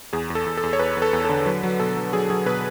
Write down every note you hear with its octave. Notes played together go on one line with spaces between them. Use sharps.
E2 G#4
E2
A4
E2
A4
E2
C#5
E2 B4
E2
A4
E2
A4
D3
F#3 B4
F#3
B2 A4
F#3
F#3 G#4
F#3 G#4
B2 B4